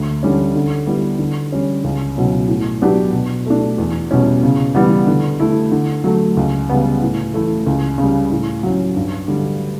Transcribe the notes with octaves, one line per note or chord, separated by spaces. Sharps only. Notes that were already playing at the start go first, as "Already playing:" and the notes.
Already playing: D2
D3 G3 C#4
D3
G3 B3 E4 G4
D3
G3 C#4
C#2
B2 F#3 C#4 E4
A2
F#3 B3 D4 G4
B2
A3 D4
E2
B2 G3 C#4 E4
C#3
E3 G3 B3
D3
A3 E4
D3
F#3 A3
C#2
C#3 G3 B3
A2
E3 A3 E4
C#2
C#3
G3
A2
F#3 C#4
G2
D3 G3